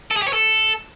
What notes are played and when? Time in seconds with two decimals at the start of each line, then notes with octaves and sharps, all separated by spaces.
0.11 A4
0.16 G#4
0.22 G4
0.28 C#5
0.33 A4